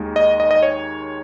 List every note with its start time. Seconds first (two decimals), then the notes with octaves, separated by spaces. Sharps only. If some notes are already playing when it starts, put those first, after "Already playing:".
Already playing: D#2 D#3 G#3
0.16 D#5
0.40 D#5
0.51 D#5
0.63 C#5